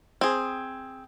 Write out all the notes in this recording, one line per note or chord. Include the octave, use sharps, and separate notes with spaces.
C4 G#4